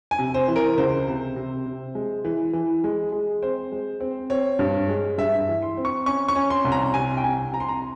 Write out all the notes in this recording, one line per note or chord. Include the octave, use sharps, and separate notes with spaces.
G#5
C3
C5
E3
A#4
C#2 C5
C3
C3
C3
G#3
E3
E3
G#3
G#3
C4 C5
G#3
C4
C4 C#5
G2
G#3
G2 E5
E5
E3
C6
C4
C#6
C#4 C#6
C#6
C#4
C6
C2
A#5
C3 G#5
G5
C2 G#5
C3 A#5
C6
A#5